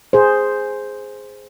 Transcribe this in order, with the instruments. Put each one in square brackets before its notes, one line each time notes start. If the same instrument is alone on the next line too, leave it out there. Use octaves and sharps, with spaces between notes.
[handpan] G#4 C5